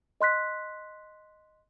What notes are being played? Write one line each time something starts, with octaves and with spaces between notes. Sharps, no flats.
D#5 C6 F#6 B6